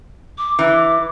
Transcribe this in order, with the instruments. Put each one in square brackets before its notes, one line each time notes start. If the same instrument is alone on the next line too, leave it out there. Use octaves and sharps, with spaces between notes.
[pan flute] D6
[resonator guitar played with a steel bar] E3